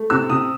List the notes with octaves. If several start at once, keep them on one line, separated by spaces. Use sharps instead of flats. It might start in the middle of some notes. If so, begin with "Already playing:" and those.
Already playing: A3
C3 E6
C3 D#6